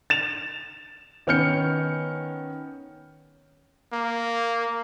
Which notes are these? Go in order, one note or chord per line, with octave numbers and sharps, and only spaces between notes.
A6 E7 F7
D#3 B3 C#4 F6 G6 C#7
A#3